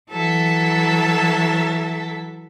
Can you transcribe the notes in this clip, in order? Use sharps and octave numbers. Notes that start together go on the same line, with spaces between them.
E3 F#3 A4 E5